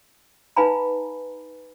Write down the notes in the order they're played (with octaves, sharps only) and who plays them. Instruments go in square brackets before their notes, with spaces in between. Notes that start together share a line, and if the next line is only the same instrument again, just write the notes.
[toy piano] D#4 B4 F5 G#5 A#5 B5